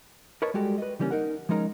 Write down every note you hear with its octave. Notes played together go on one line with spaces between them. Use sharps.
A#4 B4 C#5 D#5 A5
G3 G#3 F#4 G4 A4 D5
B4 D#5
C#3 E3 G3 A#3 C#4
D#4 A#4 F#5
F3 G#3 C#4 D#4 A#4 A#5